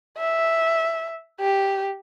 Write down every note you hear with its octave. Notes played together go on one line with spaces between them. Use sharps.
E5
G4